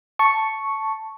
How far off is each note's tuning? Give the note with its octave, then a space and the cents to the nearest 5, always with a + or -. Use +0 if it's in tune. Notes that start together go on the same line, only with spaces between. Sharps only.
A5 +0 C#6 +0